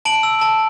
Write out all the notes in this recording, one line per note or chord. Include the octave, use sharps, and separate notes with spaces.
A5 D7 F#7
E6
A5